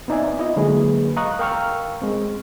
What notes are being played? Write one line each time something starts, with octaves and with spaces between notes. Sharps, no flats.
B3 C4 D#4 D5 E5 G#5
E4 F4 D#5
D3 F#3 G#3 A#3 G#4 B4
D#5 F5 A#5 C#6 D#6 F#6
A#4 F5 G5 C#6 E6 F6
G#3 C4